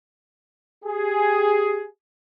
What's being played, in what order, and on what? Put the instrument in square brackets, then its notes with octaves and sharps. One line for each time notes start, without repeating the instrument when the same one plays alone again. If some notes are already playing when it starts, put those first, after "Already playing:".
[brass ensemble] G4 G#4